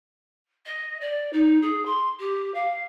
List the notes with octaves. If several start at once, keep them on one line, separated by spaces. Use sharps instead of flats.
D#5
D5
D#4
G#4
C6
G4
F5